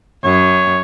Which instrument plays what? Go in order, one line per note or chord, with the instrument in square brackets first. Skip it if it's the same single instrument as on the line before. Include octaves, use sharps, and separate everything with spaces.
[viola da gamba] F#2 [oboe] C#5